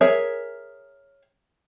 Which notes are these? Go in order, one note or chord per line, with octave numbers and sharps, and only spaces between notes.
G#4 A#4 C#5 E5